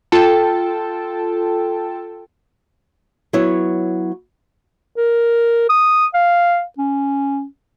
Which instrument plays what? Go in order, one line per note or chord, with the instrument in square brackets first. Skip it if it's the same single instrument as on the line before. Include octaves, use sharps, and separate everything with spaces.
[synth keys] F4 A4 G5 A5
[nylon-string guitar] F#3 B3 E4 C#5
[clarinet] A#4
D#6
F5
C#4